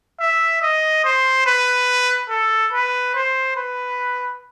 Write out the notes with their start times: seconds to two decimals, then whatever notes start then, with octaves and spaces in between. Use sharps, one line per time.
0.20 E5
0.62 D#5
1.04 C5
1.46 B4
2.29 A4
2.73 B4
3.15 C5
3.56 B4